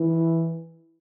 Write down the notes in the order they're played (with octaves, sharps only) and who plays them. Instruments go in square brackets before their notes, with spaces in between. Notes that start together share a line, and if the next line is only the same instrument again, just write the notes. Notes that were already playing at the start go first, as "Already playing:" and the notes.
Already playing: [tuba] E3